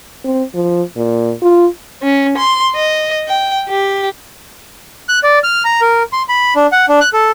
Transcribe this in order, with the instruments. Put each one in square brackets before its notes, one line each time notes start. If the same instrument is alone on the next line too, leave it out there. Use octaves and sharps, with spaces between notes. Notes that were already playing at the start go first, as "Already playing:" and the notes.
[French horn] C4
F3
A#2
F4
[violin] C#4
C6
D#5
G5
G4
[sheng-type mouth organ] F#6
D5
F6
A#5
A#4
C6
B5
D4
F#5
D4
F#6
A4